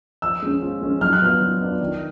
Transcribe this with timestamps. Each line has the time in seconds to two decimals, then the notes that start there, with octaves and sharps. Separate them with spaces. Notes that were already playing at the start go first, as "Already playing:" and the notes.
0.22 F3 E6
0.42 G#3 C#4
0.62 F3
0.82 G#3 C#4
1.01 F#3 F6
1.13 F#6
1.22 B3 D4 F4 F6
1.41 F#3
1.60 B3 D4 F4
1.80 D#3